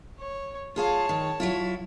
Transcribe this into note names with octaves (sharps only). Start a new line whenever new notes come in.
C#5
F4 G#4 C#5 F5 A5
D#3
F#3 E4 F4